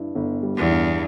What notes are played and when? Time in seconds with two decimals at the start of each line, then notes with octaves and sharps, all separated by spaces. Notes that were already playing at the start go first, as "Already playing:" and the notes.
Already playing: G2 E4
0.15 G1
0.42 G3
0.57 E2
0.70 G2